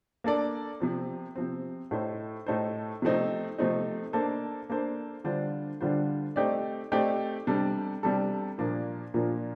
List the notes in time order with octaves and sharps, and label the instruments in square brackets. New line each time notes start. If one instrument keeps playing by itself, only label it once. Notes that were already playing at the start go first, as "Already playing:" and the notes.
[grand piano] A#3 D4 A4 D5
C3 F3 C4
C3 F3 C4
A2 A3 D#4 A4 C5
A2 A3 D#4 A4 C5
C3 F3 A3 C4 D#4
C3 F3 A3 C4 D#4
A#3 D4 A4 C5
A#3 D4 A4 C5
D3 G3 D4 F4 C5
D3 G3 D4 F4 C5
A3 C4 D#4 G4 D5
A3 C4 D#4 G4 D5
C3 G3 D4 A4
C3 G3 D4 A4
A#2 F3 A#3 D4 F4
A#2 F3 A#3 D4 F4